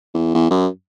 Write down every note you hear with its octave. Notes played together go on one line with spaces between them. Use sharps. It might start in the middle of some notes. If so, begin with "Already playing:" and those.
E2
E2
F#2